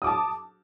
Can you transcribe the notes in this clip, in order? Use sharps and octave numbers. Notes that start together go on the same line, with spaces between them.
A5 D6 D#6